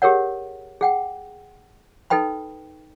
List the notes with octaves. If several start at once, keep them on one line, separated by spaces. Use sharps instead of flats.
G4 G#4 A#4 C#5 F#5
G#4 F#5 G5
D#4 A4 B4 G5 B5